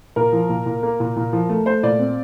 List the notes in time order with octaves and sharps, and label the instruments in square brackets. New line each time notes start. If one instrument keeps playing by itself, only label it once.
[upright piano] A#2 A#4
F3
A#2
A#2
A#3
A#2
A#2
F3
A3
A3 C5
A#2 D5
C4